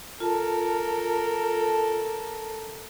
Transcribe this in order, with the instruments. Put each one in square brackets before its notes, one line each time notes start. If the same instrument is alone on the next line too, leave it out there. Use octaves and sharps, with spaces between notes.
[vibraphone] F4 A5 [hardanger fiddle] A4 A#4